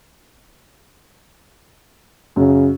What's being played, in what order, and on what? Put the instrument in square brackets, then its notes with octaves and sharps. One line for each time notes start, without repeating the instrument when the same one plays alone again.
[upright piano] F#2 [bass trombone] C#3